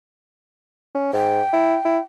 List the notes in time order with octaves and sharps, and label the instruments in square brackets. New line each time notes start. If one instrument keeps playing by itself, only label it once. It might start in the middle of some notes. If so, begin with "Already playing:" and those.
[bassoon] C#4
[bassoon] G#2 [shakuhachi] G5
[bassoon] E4
E4